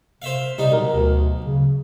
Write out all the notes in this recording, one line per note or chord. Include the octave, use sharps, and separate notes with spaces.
C3 C5 E5 F5
C3 G3 D#4
B1 A#4
D2
C#3